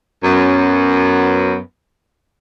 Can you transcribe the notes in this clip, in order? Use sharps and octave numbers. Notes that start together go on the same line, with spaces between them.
F#2 B3